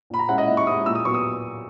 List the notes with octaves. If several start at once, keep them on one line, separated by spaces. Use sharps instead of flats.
A#2 B5
A#5
G#3 C#4 E4 F#5
D#5
A#2 E5
C#6
G#3 C#4 E4 D#6
A#2 E6
D#6
F#3 B3 C#6
D#6